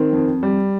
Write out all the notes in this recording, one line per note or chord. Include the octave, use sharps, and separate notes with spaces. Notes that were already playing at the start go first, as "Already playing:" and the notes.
Already playing: D#3 C4
F2
G3